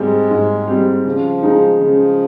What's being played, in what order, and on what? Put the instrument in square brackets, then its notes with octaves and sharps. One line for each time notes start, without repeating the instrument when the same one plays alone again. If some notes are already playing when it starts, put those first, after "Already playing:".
Already playing: [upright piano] G#2 G3 C4 G4 [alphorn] G#3
[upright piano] G#2
G3 C4 G4
[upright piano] C#3 [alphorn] F3
[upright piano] G#3 D#4
[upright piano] C#3 [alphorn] F3